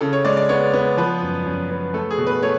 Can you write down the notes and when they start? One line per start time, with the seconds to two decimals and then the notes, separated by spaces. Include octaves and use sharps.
0.01 C#3 A4
0.13 C#5
0.25 G#3 D5
0.37 D5
0.49 B3 C#5
0.73 B3
0.97 F3 B4
1.22 F#2
1.45 F#2
1.71 B3
1.94 A3 A4
2.11 G#4
2.18 B2
2.27 B4
2.43 A3 C#5